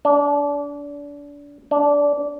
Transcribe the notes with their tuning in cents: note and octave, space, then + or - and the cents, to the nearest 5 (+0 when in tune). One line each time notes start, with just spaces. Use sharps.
D4 -30
D4 -20